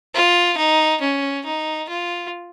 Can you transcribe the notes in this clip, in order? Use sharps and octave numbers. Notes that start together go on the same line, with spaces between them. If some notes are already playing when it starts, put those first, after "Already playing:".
F4
D#4
C#4
D#4
F4